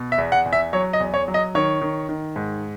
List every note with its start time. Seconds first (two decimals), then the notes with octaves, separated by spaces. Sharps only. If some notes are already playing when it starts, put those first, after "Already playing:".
Already playing: B2
0.12 E5
0.18 E2
0.32 F#5
0.46 E2
0.53 E5
0.73 F#3 C#5
0.93 D#5
1.00 E2
1.14 C#5
1.28 F#3
1.34 D#5
1.55 D#3 C#5
1.81 D#3
2.09 D#3
2.36 G#2